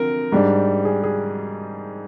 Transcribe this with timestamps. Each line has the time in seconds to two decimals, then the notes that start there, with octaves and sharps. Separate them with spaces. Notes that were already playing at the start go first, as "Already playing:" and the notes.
Already playing: D3 F3 C4 A#4
0.32 G#2 G3 D4
0.85 G#4
1.04 G#4